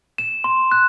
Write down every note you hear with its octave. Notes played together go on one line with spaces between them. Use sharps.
E7
C6
F#6